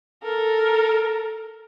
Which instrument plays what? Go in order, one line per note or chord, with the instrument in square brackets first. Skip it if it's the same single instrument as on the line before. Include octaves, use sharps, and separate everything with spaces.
[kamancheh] A4 A#4